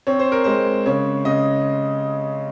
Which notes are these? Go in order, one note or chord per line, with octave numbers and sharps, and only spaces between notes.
C4 C#5
C5
A#4
G#3 C5
C#3 C#5
C#3 D#5